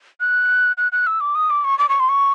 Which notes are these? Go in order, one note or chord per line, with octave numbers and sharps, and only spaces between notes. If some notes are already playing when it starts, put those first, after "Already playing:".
F#6
F#6
F#6
E6
D6
D#6
D6
C#6
D6
C#6
C6
C#6